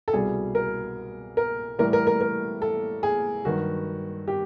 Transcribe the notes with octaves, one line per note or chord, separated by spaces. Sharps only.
A4
C2 B2 G3 G#4
A#4
A#4
A2 E3 G3 A#4
A#4
A#4
A#4
A4
G#4
G2 D#3 F#3 F#4
G4